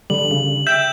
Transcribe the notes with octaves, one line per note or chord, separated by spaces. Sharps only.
D3 G3 F#7
C#3
E5 G5 G6 E7